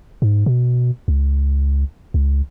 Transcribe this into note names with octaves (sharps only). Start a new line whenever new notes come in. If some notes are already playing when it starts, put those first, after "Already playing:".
G#2
B2
C#2
C#2